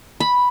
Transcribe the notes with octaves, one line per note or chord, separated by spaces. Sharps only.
B5